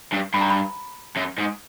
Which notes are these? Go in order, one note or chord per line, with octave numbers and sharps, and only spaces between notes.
G2
G2 B5
A#5
B5
F#2
G#2